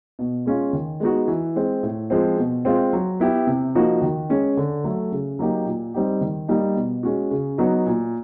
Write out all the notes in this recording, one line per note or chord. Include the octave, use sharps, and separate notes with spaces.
B2
G#3 C#4 F4
D#3
G#3 B3 D#4 F#4
E3
G#3 C4
A2
F3 G#3 C4
B2
G#3 C4 F4
F#3
B3 E4 G4
C3
F3 A#3 D#4 F#4
D#3
G#3 C#4
D3
F#3 A3
C#3
F#3 A#3 D#4 G4
A#2
G3 C4 D#4 G4
D#3
G3 A#3 D#4
B2
G#3 C#4 F#4
C#3
F#3 B3 D#4 F#4
A#2